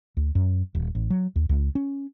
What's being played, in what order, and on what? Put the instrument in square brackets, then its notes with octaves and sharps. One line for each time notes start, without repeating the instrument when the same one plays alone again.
[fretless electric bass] D2
F#2
D#1
A1
F#3
D#2
C#2
C#4